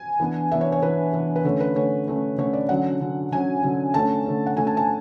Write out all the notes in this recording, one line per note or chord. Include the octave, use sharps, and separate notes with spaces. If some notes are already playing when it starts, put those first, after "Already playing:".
Already playing: G#5
E3 B3 D4
E3 B3 D4 E5
C#5
C#5
E3 B3 D4 B4
E3 B3 D4
B4
D3 A3 C#4 C#5
B4
D3 A3 C#4 C#5
D3 A3 C#4
D3 A3 C#4 C#5
D5
D3 F#3 C#4 F#5
D3 F#3 C#4
D3 F#3 C#4 G#5
D3 F#3 C#4
D3 A3 C#4 A5
D3 A3 C#4
F#5
D3 A3 C#4 G#5
A5
A5